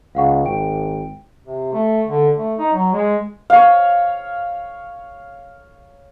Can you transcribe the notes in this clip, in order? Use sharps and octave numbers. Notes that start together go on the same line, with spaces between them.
C#2 F5 F#5 C#6
G#1 G5 D7
C3
A3
D3
A3
D#4
F#3
G#3
C#5 F5